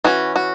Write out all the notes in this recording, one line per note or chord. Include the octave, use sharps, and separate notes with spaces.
E3 C#4 F#4
F#4